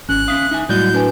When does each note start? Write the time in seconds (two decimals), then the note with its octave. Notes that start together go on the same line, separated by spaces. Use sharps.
0.09 G#1 C#4 F#6
0.28 C#4 E5 F5 D#6
0.51 D#4 E5 G#5
0.69 A2 F#3 G3 F#4 D5 D#5 G6
0.94 D4 A#4 B4 G#5